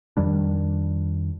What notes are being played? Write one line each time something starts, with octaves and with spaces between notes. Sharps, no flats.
F2 D#3 G3 D4